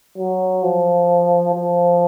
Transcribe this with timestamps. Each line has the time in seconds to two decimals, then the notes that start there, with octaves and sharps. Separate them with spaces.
0.18 F#3
0.63 F3
1.55 F3